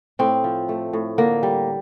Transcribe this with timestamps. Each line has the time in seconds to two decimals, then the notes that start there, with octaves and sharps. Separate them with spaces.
0.19 A2 C4
0.44 F3
0.69 A3
0.93 A2
1.18 D3 A#3
1.43 G3